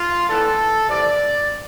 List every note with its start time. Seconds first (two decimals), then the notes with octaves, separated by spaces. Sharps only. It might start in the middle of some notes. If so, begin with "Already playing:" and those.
Already playing: F4
0.28 A2 E3 B3 D4 A4
0.88 C3 E3 G3 D5